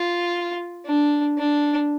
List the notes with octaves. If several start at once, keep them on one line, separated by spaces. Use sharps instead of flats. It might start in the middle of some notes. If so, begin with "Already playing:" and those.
Already playing: F4
D4
D4